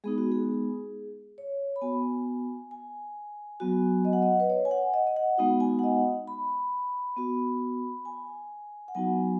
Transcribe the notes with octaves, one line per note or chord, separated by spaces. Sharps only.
G#3 B3 D#4 G#4
F#4
G#4
C#5
B5
B3 F#4 G#5
G#5
F#3 B3 F#4 G#5
D#5
F#5
D#5
B4
C#5
G#5
F#5
D#5
D#5
F#5
G#3 B3 D#4 F#4
G#5
F#5
D#5
B5
B3 F#4
G#5
F#5
F#3 B3 D#4 F#4 G#5